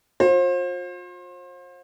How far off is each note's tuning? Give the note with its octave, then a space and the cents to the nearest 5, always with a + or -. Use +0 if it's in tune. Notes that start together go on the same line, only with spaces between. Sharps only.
F4 +40 C5 +35